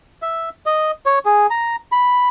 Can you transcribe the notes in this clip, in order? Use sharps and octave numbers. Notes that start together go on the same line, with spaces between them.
E5
D#5
C#5
G#4
A#5
B5